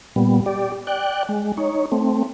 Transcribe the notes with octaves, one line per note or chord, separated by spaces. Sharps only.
A#2 G3 B3
G4 D5
D5 G5 F#6
G#3
D#4 C#5
A3 C4